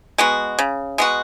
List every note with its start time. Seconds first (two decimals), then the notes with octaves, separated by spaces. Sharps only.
0.18 G#3 B3 F#4
0.59 C#3
0.98 G#3 B3 F#4